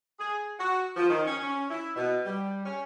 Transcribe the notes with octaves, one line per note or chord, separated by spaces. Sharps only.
G#4
F#4
F3
D#3
C#4
C#4
E4
B2
G3
C#4